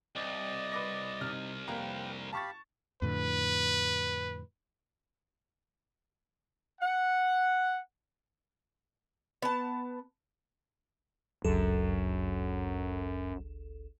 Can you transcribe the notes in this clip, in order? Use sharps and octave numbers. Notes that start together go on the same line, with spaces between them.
C2 D5 D#5
B4 D6 A#6
C3 D#4 F6
F1 A#3 A#4 B4 G5
G4 F5 A5 B5 C#6 A6
F2 A2 D3 B4
F#5
B3 A5
G1 C#2 F#2 A4